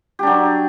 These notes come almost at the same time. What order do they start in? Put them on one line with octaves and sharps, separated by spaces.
G4 D4 F#3